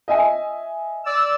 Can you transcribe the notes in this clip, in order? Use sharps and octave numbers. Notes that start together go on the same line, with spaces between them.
D#5 E5 G#5
D5 E6